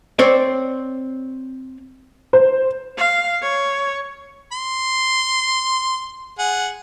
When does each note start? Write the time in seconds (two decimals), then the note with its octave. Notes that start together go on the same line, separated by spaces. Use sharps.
0.19 C4 C#5 D5
2.33 C5
2.97 F5
3.42 C#5
4.52 C6
6.39 G#4 F#5